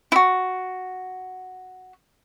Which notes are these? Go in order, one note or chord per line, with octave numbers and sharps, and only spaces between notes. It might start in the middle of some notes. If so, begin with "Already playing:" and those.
E4 F#4